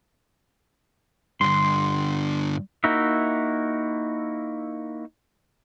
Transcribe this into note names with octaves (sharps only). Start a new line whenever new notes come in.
G2 D3 C6
A#3 D#4 E4 F#4 E5